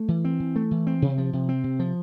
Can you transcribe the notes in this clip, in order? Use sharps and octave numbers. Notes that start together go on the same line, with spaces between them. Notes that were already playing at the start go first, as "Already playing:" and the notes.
Already playing: A3
E3
C4
E3
A3
E3
C4
C3
F3
C3
C4
C3
F3